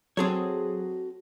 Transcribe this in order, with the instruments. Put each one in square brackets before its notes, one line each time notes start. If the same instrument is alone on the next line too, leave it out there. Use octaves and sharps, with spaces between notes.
[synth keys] F#3 G#4 [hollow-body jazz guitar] C4 A4 C#5 [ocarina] F#4